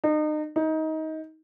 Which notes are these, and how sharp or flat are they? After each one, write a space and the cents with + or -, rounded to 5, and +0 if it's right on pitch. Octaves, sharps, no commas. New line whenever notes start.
D#4 -35
D#4 +20